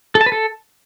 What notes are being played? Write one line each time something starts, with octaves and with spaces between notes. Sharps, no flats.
A4
A5
B4
A4